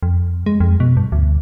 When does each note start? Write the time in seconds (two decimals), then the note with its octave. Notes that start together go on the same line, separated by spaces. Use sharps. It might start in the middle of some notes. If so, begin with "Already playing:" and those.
0.03 F2
0.46 G#3
0.60 F2
0.80 B2
0.97 G2
1.12 D2